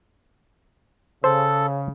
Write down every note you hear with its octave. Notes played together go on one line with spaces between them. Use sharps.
C#3 A4 C5